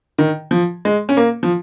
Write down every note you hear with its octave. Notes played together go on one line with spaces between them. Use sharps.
D#3
F3
G#3
C#4
A#3
F3